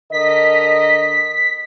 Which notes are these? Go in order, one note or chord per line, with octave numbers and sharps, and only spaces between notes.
D3 A#4 D#5 B6